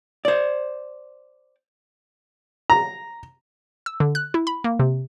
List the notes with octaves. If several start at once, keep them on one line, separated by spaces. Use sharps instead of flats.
C5 D5
A#5
E6
D3
F#6
E4
B5
A#3
C3